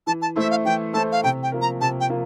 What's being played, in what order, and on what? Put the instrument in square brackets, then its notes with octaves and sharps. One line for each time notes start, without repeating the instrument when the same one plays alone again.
[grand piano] E3 [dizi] A5
[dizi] A5
[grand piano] A3 E4 A4 C5 [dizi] E5
[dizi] F5
[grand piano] E3 [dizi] G5
[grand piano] A3 E4 A4 C5 [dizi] A5
[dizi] F5
[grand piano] C3 [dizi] G5
[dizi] G5
[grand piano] F3 A#3 F4 A#4
[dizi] A#5
[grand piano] C3 [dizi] A5
[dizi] G5
[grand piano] F3 A#3 F4